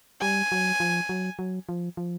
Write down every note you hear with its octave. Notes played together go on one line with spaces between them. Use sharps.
G3 G#5
F#3
F3
F#3
F#3
F3
F3